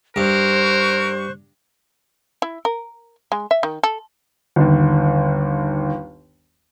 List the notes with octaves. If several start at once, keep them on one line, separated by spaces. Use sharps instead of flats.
G2 A#4 C5 C#6 F#6
E4
A#4
G#3
E5
D#3
A4
G1 D#2